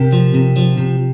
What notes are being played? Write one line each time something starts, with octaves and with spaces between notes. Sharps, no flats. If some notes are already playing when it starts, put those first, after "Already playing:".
Already playing: C3 G4 A#4
F3
C3
F3
C3